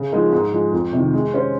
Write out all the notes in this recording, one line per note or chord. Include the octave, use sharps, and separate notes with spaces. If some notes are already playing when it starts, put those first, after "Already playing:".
Already playing: C#3
F3 G#3 D#4 A#4
G#2
F3 G#3
F2
C3 D#3
G#3
C#4 G4 C5